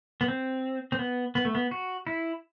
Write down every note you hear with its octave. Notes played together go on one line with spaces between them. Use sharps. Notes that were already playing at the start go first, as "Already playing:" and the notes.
B3
C4
C4
B3
B3
A3
B3
F#4
E4